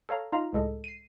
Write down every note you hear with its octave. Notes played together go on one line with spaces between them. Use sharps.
A4 C#5 F5 A#5
D#4 F4 F5 A#5
C#2 A2 G#3 A4 D#5
C7 D#7